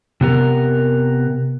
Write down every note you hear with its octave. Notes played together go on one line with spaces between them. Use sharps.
C3 B3 A#4